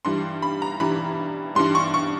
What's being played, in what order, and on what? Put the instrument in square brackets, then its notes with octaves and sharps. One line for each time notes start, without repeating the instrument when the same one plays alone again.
[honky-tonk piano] G2 E3 G3 C6
B5
A#5
G2 E3 G3 B5
G2 E3 G3 C6
C#6
C#6